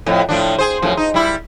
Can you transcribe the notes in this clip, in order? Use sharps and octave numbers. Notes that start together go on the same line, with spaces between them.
F2 A2
A2 F3 D4
G#4 C5
F#2 A2 F3
D#4
G3 E4